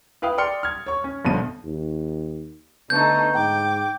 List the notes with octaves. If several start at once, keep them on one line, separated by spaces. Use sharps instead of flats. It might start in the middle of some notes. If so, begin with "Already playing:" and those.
E4 B4 F5 G5 D#6
D5 G5 C6 F6 C#7
F6 G#6
C#5 C#6
C#4
G1 F2 B2 D3 D#7
D#2
D3 A3 B3 D#4 G6
G#2 G5 D6